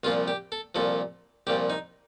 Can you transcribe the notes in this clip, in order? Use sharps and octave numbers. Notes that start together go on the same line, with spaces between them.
C2 A#2 F3 F4
G4
A4
C2 A#2 F3 A4
C2 A#2 F3 G4
D#4